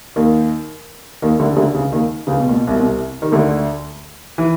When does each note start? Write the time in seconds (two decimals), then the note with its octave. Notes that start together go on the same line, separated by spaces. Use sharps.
0.16 D#2 D#3
1.22 D#2 D#3
1.39 D2 D3
1.53 C#3
1.56 D2 D3
1.74 C#2 C#3
1.92 D#2 D#3
2.27 C#2 C#3
2.40 B2
2.49 A#2
2.53 B2
2.67 C2 C3
2.75 B2
2.80 C2 C3
3.22 D#3
3.32 D2 D3
4.38 E3